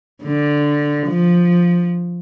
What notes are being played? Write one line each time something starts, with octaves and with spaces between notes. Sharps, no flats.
D3
F3